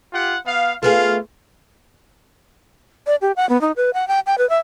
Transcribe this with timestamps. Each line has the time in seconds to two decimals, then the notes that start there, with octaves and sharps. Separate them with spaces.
0.13 F4 G4 F#5
0.46 B3 F5
0.83 A3 B3 F4 G#4 F5
3.07 D5
3.21 G4
3.36 F#5
3.49 B3
3.61 D#4
3.76 B4
3.94 F#5
4.08 G5
4.27 G5
4.38 B4
4.50 E5